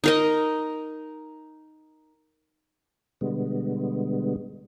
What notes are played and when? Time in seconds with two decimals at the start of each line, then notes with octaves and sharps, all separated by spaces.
0.04 D#4 A#4 D#5
3.21 B2 D3 G3 G#3 B3